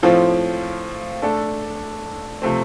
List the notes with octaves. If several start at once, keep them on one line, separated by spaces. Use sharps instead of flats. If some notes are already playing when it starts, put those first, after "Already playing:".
A2 F3 C4 F4
A3 D4 A4
C3 F3 A3 C4